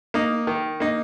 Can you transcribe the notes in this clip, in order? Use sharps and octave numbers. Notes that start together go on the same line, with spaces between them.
A#3 D#4
D#3
A#3 D#4